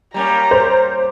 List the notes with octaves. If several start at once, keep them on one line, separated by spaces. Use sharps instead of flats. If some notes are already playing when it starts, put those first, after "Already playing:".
G3 A#3 C#4 A#5
C5